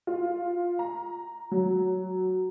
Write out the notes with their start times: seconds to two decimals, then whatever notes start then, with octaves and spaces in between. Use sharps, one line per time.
0.07 F4
0.79 A#5
1.51 F#3